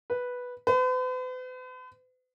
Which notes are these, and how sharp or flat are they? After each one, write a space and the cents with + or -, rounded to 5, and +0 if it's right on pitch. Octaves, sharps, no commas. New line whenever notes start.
B4 -5
B4 +45